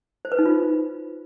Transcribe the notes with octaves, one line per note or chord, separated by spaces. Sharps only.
C5
B4
D#4
F4